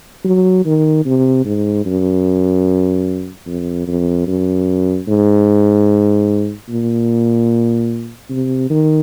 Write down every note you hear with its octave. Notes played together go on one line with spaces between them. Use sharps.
F#3
D#3
C3
G#2
F#2
F2
F2
F#2
G#2
A#2
C3
D#3